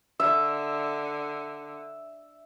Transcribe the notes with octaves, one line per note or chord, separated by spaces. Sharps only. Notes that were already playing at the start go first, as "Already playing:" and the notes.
D3 E5